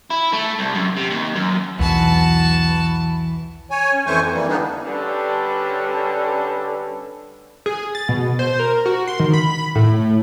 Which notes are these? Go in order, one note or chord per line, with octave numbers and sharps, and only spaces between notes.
E4
A3
C2
F#2
C3
D#2
F#2
B1 E2 E3 F#4 A5
C#5 G#5
C#4
F2 E3 A3 C5 G#5 C#6
F2
E3 G3 A#3
D3 G3 B3 D4 D#4
D3 G3 C#4 D4 A4 B4
G#4
A6
B2
C5
A#4
F#4
C6
D#3
B5
A2